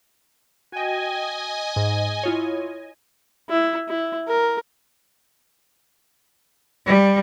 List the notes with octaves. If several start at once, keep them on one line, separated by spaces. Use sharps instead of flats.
F#4 D#5 G5 G#5
G#2
E4 F4 C#5
E4
E4
A#4
G3